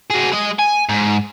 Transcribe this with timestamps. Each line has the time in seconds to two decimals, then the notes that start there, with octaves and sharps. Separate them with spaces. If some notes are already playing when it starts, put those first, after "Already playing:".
0.10 F#4 G#4
0.32 G#3 D#5
0.59 G#5
0.89 G#2